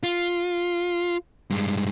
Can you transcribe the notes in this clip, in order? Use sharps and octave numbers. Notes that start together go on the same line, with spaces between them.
F4
G2 G#3